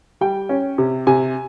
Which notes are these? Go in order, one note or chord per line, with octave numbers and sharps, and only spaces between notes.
G3 G5
C#4
C3
C3 G#5